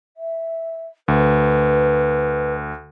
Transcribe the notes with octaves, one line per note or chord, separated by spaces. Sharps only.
E5
D2 B4